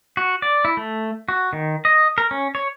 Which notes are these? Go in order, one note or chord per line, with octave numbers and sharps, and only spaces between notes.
F#4
D5
E4
A3
F#4
D#3
D#5
A#4
C#4
C#5